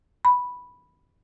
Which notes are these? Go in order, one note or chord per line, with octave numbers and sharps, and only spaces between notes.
B5